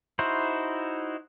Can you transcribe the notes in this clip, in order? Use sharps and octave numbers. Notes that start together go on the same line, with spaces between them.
D#4 E4 F#4 C5